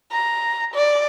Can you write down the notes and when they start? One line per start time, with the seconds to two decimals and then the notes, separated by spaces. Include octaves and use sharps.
0.12 A#5
0.74 D5